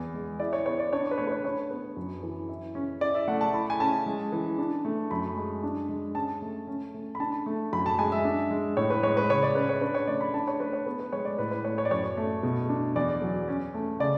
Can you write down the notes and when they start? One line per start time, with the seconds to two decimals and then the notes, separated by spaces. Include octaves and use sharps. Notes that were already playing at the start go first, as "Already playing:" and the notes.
Already playing: E2
0.14 G#3
0.40 E4 D5
0.53 C#5
0.66 B3 C#5
0.79 D5
0.93 D4 C#5
1.11 B4
1.18 A3 C#5
1.27 B4
1.32 C#5
1.44 D4 C#5
1.71 B3
1.97 F#2
2.23 E3
2.49 E4
2.75 C#4
3.01 E4 D5
3.15 E5
3.28 A3 F#5
3.41 A5
3.54 E4 B5
3.70 G#5
3.80 C#4 A5
4.06 G#3
4.32 E3
4.58 D4
4.85 A3
5.11 F#2 B5
5.36 G#3
5.63 D4
5.89 G#3
6.15 C#4 A5
6.42 A3
6.67 C#4
6.94 A3
7.15 B5
7.20 D4 A5
7.46 A3
7.73 F#2 B5
7.86 A5
7.99 G#3 G#5
8.12 E5
8.25 D4
8.51 G#3
8.77 A2 C#5
8.90 B4
9.03 G#3 C#5
9.17 B4
9.30 C#3 C#5
9.43 D5
9.55 C#4 B4
9.69 C#5
9.81 D4 B4
9.94 C#5
10.07 A3 D5
10.21 B5
10.34 D4 A5
10.47 C#5
10.60 A3 B4
10.73 C#5
10.86 B3
10.99 B4
11.12 G#3 C#5
11.25 D5
11.39 A2 B4
11.51 B4
11.64 A3 C#5
11.78 C#5
11.85 D5
11.91 F#2 C#5
12.17 A3
12.43 B2
12.69 D4
12.96 E2 D5
13.22 F#3
13.48 C#4
13.74 A3
14.00 C#3 D5